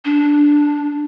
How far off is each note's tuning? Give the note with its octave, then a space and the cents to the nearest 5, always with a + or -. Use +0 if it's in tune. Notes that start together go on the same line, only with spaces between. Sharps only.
D4 -5